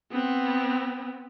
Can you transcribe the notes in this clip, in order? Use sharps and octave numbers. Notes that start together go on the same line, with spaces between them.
B3 C4